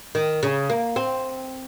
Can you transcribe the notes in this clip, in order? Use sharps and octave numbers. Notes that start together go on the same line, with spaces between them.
D#3
C#3
A#3
C4